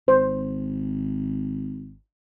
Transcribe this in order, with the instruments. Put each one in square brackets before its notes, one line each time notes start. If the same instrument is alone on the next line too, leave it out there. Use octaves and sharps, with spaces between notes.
[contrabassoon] G#1 [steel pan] C5